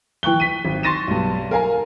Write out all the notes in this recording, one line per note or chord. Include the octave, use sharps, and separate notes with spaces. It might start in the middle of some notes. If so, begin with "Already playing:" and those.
E3 G5 C#6 F#6 G7
B6 D#7
G#1
C6 C#6 A6 A#6 D#7 E7
B1 G2
A#4 F5 G#5 A#5